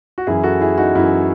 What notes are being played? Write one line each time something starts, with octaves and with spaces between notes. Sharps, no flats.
F#4
F#2 E3 E4 G#4
F#4 A4
E4 G#4
D#4 F#4
F#2 E3 E4